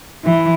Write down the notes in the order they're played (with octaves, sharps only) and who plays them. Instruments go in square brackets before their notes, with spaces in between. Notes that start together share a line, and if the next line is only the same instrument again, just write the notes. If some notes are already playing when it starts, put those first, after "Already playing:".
[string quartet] E3